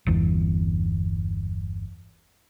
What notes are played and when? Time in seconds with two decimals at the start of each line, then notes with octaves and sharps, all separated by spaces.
0.07 G1 E2